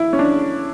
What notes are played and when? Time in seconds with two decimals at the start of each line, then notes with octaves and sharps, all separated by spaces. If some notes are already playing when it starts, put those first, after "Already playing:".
Already playing: E4
0.13 C#4
0.19 D4